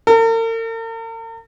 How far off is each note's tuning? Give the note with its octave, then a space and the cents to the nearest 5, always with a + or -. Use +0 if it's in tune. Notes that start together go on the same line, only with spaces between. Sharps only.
A#4 -45